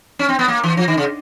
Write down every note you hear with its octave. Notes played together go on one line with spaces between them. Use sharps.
C#4
C4
B3
A#3
E3
F3
D#3
C#3